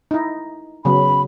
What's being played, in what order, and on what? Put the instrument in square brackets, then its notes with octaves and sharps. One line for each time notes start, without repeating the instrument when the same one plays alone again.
[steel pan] D#4 E4
[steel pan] C#3 F#3 B3 [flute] B5